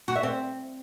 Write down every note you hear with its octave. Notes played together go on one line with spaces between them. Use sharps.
F#4
E5
C4